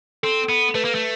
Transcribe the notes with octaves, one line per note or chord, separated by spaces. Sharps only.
C4 A4
B3
A3 B4
A#3
A3